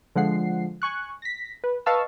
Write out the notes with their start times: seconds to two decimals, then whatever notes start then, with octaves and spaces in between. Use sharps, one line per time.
0.15 D3 F3 G#3 F#5 C7
0.82 G#5 C#6 F#6
1.22 A#6 B6
1.64 B4
1.86 B4 D#5 F5 A5 C#6 E6